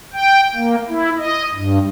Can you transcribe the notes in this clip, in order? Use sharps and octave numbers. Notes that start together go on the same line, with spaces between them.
G5
A#3
E4
D#5
G2